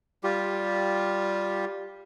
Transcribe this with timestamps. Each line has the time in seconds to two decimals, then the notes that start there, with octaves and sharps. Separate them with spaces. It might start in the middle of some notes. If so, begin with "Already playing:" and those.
0.24 G3 F4 G4